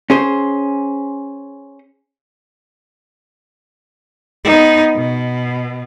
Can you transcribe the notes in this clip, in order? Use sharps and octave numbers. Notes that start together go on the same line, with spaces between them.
C#4 G#4 C5
B3 D#4
B2